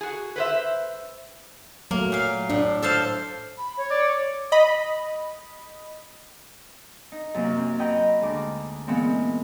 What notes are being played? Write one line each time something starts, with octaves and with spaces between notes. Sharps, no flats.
F#4 G#4
B4 C5 E5
F#3 A3 A#3
A#2 F5
A2 D4
A4 C5 F5
B5
C#5
D5
D#5 B5
D#4
F#2 C3 A#3
C4 C#4
D#5 F#5 G5 A#5 B5
D2 G#3 D6
A#2 E3 G#3 B3 C4